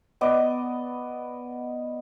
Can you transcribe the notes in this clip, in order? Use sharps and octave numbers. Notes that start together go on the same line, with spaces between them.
B3 D5 D#5